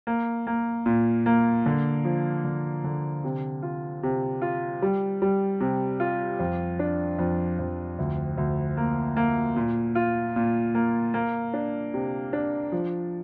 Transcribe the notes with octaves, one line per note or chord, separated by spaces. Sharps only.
A#3
A#3
A#2
A#3
D3
F3
D3
D3
C3
F4
C3
F4
G3
G3
C3
F4
F2
D4
F2
F2
D2
D2
A#3
A#3
A#2
F4
A#2
A#3
A#3
D4
C3
D4
F3